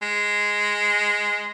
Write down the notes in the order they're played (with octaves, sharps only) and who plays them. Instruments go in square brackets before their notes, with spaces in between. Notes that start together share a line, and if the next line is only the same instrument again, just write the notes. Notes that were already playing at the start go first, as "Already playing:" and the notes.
[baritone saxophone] G#3